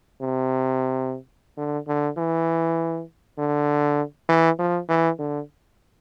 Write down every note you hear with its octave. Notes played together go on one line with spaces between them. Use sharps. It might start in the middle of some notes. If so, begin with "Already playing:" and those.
C3
D3
D3
E3
D3
E3
F3
E3
D3